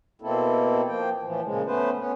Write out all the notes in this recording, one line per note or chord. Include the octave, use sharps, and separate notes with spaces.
B2 A#3 C4 E4 A4
F3 A#3 G5
A2 E3 F3
A#2 C#3 F3 G#3
A3 B3 C#4 B4 C5
B3 C#4